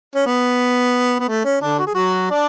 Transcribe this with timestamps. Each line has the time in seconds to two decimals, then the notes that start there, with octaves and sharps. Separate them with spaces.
0.15 C#4
0.26 B3
1.20 B3
1.29 A3
1.45 C#4
1.62 D3 D4
1.79 F#4
1.87 G#4
1.95 F#3 F#4
2.30 D4 D5